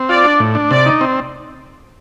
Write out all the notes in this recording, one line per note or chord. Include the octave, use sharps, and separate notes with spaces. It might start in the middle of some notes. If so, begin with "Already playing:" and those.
Already playing: C4
F4 D5
D4
A2
D4
C3 D5
D#4
C4